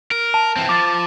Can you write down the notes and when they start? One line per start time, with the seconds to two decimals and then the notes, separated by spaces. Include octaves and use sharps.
0.11 A#4
0.34 A5
0.56 E3 C4
0.69 F3 D6 A6